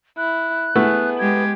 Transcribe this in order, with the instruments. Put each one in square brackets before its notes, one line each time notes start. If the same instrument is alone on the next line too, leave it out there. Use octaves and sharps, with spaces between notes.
[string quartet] E4 [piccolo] F#6
[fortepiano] A3 E4 [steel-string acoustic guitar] B3 [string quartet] G#4
[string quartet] G#3 G4 [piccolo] G#6